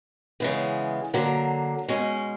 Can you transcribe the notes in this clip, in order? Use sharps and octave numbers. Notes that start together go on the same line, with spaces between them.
C#3 E3 G#3 B3
D3 F#3 A#3
B2 G#3 C#4